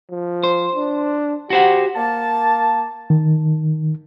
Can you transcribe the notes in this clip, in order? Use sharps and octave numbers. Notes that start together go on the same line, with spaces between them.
F3
C5
D4
F#4 G4 C5 F#5
A#3 A5
D#3